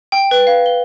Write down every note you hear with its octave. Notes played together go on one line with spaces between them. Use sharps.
G5
B4
F5
G7